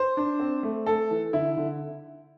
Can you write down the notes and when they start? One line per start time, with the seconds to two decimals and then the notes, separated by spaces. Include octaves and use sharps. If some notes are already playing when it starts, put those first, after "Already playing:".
Already playing: C5
0.17 D4
0.40 C4
0.63 A3
0.86 A3 A4
1.11 E3
1.33 D3 E4
1.57 D3